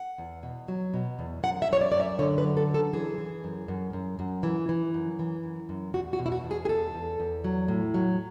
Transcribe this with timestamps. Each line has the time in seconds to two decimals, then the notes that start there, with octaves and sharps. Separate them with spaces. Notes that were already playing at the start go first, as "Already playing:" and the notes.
Already playing: F#5
0.18 E2
0.43 B2
0.68 F#3
0.94 B2
1.19 E2
1.43 F#2 F#5
1.62 E5
1.69 F#2 C#5
1.81 D5
1.92 F#2 D5
2.00 E5
2.19 D3 C#5
2.38 B4
2.44 F#3
2.57 A4
2.68 F#2
2.74 A4
2.93 E3 G#4
3.18 E3
3.44 F#2
3.68 F#2
3.93 F#2
4.19 F#2
4.43 E3
4.69 E3
4.94 F#2
5.19 E3
5.44 F#2
5.69 F#2
5.94 E2 F#4
6.13 F#4
6.19 B2
6.26 E4
6.32 F#4
6.44 E2
6.51 G#4
6.65 G#4
6.69 E2 A4
6.94 E2
7.20 E2
7.44 F#3
7.68 A2
7.94 F#3